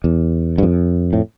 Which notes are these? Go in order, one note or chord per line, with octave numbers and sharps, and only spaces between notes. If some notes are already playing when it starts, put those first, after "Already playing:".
E2
G2
F2
A2